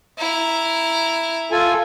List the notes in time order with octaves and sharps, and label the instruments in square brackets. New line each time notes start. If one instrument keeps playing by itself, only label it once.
[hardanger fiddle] E4 A#5
[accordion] F4 A4 G#5